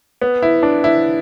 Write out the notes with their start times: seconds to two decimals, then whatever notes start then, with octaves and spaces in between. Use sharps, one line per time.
0.21 B3
0.42 E4
0.63 D4
0.84 E4